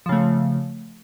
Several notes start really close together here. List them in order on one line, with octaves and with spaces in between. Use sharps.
F3 C#3 A3